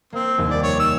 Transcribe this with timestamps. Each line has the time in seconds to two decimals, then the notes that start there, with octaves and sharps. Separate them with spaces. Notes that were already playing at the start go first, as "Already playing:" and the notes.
0.13 A#3 C4
0.38 F1 D#2
0.49 G3 D5
0.63 C#5
0.80 E6